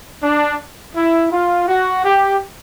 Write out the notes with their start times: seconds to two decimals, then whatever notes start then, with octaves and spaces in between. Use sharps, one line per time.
0.23 D4
0.95 E4
1.32 F4
1.68 F#4
2.05 G4